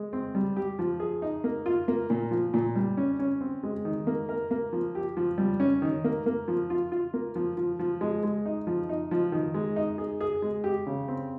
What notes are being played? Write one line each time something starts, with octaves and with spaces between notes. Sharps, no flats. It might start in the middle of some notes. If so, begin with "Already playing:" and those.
Already playing: G#3
C4
G3
G4
F3
G#4
D#4
A#3
F4
A#3
A#2
F3
A#2
G3
C#4
C#4
C4
G#3
D#3
A#3
A#4
A#3
F3
G4
F3
G3
C#4
D#3
A#3
A#3
F3
F4
F4
A#3
F3
F3
F3
G#3
G#3
D#4
F3
D#4
F3
D#3
G#3
D#4
G#4
G#4
G#3
G4
C#3
C4